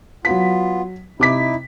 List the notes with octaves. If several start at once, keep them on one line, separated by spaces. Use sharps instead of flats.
F#3 B3 F4 B6
C3 D#4 E4 D6 B6